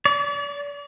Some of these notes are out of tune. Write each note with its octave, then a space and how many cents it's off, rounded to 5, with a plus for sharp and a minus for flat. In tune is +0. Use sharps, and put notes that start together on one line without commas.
D5 -40